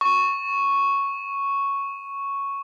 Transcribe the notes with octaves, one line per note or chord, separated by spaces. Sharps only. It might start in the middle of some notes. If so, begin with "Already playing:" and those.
C#6 D#7